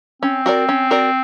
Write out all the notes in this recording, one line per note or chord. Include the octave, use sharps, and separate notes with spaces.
C4 C#4
F#4 A#4 D5
C#4
F#4 A#4 D5